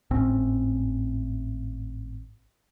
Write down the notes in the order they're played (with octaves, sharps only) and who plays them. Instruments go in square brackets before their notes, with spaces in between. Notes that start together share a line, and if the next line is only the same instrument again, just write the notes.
[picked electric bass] G#1 A2 C4 C#4